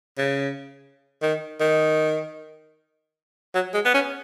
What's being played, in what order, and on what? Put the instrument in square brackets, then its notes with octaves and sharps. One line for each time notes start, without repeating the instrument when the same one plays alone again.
[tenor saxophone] C#3
D#3
D#3
F#3
G#3
B3
C#4